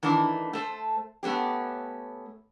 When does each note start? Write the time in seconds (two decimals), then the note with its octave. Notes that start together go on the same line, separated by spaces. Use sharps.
0.03 D#3 E3 A3 D4
0.53 A3 A4 C5
1.23 A3 B3 C#4 G4